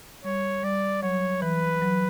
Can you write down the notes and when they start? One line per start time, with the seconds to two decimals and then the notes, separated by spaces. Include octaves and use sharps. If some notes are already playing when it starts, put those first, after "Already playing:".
0.24 G3 C#5
0.63 G3 D5
1.02 F#3 C#5
1.42 E3 B4
1.81 F#3